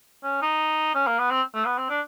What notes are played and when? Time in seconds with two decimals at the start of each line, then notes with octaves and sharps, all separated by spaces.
0.24 C#4
0.42 D#4
0.95 C#4
1.07 A#3
1.19 B3
1.31 C4
1.55 A3
1.66 B3
1.78 C4
1.90 D4